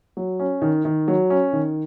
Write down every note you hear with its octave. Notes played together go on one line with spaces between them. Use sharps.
F#3
C#4
D#3
D#3
F#3
C#4
D#3